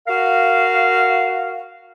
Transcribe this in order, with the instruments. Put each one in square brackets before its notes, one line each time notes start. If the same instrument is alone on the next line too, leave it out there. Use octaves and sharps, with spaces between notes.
[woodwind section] F#4 A#4 F5